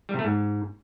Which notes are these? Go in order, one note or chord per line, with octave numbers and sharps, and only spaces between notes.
G3
C3
A3
G#2